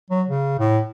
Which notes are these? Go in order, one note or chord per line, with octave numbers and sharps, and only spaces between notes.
F#3
C#3
A2